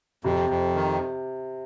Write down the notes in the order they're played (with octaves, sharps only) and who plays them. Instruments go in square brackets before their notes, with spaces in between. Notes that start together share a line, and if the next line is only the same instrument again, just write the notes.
[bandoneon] F2 [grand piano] C3
[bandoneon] F2
D#3